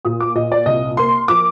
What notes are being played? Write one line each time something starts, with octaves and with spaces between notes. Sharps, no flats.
A#2 D#6
D6
A#2 D#5
D5
C2 D#5
A#3 C6
F3 D6